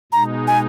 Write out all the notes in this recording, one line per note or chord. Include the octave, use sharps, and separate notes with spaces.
B2 G#3 D#4 A#5
G#5